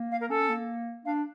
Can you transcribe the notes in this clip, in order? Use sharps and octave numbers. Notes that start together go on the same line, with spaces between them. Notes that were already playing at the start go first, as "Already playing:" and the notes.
Already playing: A#3
F5
A#4
C#4 A4
A#3
D4 F5